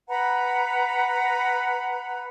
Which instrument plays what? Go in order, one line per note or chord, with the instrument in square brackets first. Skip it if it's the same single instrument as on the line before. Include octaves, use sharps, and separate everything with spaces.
[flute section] B4 F#5 A#5 B5